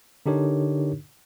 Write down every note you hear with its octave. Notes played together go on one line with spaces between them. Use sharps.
D3 D4 D#4 G4 A#4 C#5